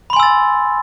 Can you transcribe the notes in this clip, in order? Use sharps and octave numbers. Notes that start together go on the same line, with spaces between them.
G#5 B5 C6 E6 A6